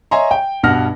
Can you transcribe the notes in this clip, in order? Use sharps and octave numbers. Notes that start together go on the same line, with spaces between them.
C#5 D#5 E5 G#5 A#5 C6
G5
G2 B2 F#5 F6 A#6